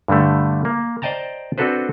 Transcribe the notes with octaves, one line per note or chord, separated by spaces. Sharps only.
G2 D3 G3 A3
A#3
C5 D5 D#5 G5 A5 A#5
C4 D4 F#4 A4 B4 C5